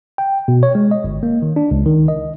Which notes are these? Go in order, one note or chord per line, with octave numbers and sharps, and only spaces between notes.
G5
B2
C#5
G#3
D#5
G1
A#3
D#3
D4
C#2
D#3
D#5